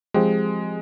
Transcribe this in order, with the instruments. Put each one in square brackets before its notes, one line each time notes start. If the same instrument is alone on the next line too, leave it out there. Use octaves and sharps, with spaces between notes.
[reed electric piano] F3 C4 G4 [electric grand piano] G#3